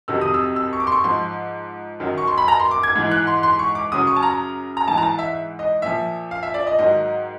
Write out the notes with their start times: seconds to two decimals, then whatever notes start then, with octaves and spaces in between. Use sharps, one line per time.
0.08 F2 C3 D#3 F#3 E6
0.21 D#6
0.34 E6
0.56 E6
0.73 C#6
0.80 D6
0.87 C6
0.92 C#6
1.04 G#2 F3 C6
2.00 F#2 D#3 F#3
2.18 C#6
2.27 C6
2.38 B5
2.48 A#5
2.60 C6
2.71 D6
2.83 G#6
2.96 G#2 E3
3.11 F#6
3.27 C6
3.43 C6
3.59 C#6
3.75 D6
3.91 F#2 C#3 F#3 D#6
4.07 C#6
4.16 A5
4.23 A#5
4.77 A#5
4.87 G#2 E3 A5
4.97 A#5
5.03 A5
5.19 E5
5.59 D#5
5.82 A#2 F3 E5
6.31 F5
6.43 E5
6.54 D5
6.67 D#5
6.79 G#2 D#3 F#3 D#5